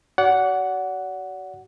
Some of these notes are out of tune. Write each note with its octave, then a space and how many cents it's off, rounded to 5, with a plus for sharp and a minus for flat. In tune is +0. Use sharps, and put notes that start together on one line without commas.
F#4 +35 D5 -40 F#5 +0